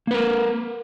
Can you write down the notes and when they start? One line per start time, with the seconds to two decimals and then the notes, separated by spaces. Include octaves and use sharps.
0.07 A#3
0.11 B4
0.14 A#4